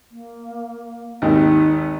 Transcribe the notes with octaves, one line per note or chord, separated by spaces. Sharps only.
A#3
G#1 D#2 D#4